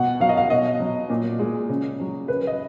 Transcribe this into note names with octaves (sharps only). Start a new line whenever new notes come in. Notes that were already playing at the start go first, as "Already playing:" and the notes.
Already playing: B2 F#5
F#3 F5
D#5
F5
B2 D#5
F#3
A#2
G#3
C#3
F#3
C#3 B4
D#5